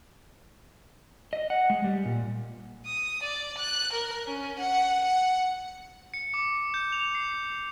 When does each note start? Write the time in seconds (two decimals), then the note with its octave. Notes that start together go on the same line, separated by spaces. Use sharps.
1.33 D#5
1.50 F#5
1.70 G#3
1.84 G3
2.05 A#2
2.86 D#6
3.23 D5
3.58 F#6
3.93 A#4
4.27 C#4
4.59 F#5
5.04 F#5
6.14 C#7
6.34 D6
6.74 G6
6.92 F7
7.15 C7